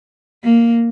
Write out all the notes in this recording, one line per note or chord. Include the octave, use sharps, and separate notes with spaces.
A#3